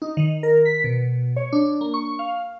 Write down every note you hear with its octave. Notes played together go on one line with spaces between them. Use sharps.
D#4
D#3
A#4
B6
B2
C#5
D4
A#3
C#6
F5